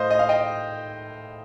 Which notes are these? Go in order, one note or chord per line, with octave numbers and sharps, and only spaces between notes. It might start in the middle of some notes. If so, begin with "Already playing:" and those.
Already playing: A2 A3 C5 D#5 F5
D#5
F5
D#5 G5